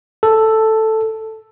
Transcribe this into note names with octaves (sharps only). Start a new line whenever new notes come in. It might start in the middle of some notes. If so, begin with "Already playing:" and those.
A4